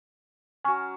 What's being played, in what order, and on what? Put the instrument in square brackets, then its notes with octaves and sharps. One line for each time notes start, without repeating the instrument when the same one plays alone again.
[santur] F#3 C#4 [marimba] G#5 C#6